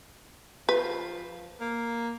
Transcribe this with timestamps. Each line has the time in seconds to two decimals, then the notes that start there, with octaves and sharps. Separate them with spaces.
0.69 F3 B4
1.61 A#3